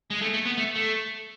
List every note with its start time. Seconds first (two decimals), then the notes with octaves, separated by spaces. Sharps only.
0.10 G#3
0.22 A3
0.34 A3
0.46 B3
0.58 A3
0.76 A3